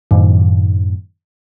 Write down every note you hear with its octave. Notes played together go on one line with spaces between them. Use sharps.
F#2 A2 D#3